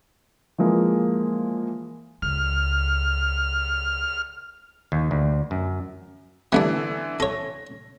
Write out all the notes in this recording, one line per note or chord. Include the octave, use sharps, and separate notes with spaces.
E3 F3 G#3 A#3
C#2 F6
D#2
D2
F#2
D3 E3 G3 A3 B3 D4
A4 C#5 A#6